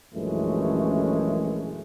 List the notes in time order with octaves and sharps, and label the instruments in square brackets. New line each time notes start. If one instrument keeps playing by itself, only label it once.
[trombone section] A#1 F#2 E3 G#3 A3 C#4